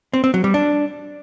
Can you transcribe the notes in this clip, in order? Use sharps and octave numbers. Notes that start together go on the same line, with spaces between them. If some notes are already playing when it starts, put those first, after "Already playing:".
C4
C4
F#3
G3
D4